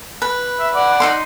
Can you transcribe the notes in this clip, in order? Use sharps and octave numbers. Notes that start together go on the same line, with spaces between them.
B4
E5
D5 F#5
D#4 E4 C6